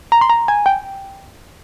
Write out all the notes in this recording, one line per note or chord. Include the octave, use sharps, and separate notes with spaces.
A#5
C6
A#5
G#5
G5